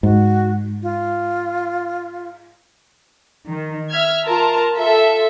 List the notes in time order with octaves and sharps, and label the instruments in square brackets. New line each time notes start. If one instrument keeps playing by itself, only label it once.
[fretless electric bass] G#2 [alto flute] F#4
[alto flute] F4
[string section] D#3
E5 F6 G#6
F4 A#4 A5 A#5
F4 A4 E5